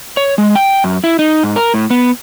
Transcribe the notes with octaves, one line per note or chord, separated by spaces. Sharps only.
C#5
G#3
G5
F#2
E4
D#4
G#2
A#4
A2
B3